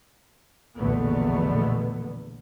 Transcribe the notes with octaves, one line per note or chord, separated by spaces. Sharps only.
A#1 E2 B2 D3 A3 B3